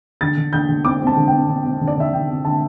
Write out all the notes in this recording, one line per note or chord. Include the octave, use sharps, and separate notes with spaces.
D3 A6
D3
D3 G6
D3
C4 D6
C4
A5
D3
C4 G5
D3
C4
D3
D5
D3 E5
D3 G5
C4
D3 A5